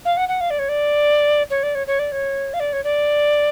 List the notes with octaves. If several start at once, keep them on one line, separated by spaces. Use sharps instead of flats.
F5
F#5
F#5
F5
D5
C#5
D5
C#5
D5
C#5
C#5
D5
C#5
F5
D5
C#5
D5